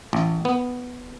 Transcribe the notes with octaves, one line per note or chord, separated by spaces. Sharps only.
A1
B3